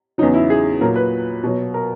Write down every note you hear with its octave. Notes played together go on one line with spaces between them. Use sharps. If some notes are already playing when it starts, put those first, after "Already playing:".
E2 C#3 F#3 D#4
E4
G#4
A#2 F#3 A#4
B4
B2 F#3
A#4